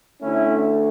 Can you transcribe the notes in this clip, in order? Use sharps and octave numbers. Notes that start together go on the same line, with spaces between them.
D2 D3 A3 C#4 E4